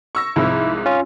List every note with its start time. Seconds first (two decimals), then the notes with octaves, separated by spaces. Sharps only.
0.15 C#6 E6 A#6
0.36 C2 G#2 F3 E4
0.86 C#4 F4